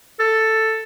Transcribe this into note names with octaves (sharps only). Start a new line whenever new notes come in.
A4